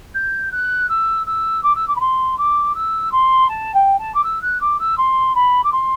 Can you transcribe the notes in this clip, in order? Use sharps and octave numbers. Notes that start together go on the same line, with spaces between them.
G6
F#6
E6
E6
D6
E6
D6
B5
C6
D6
E6
C6
A5
G5
A5
D6
E6
F#6
D6
E6
C6
B5
D6
C6